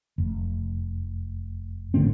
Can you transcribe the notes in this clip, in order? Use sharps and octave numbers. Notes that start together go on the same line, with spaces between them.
F1
G#1 A2 D3 C4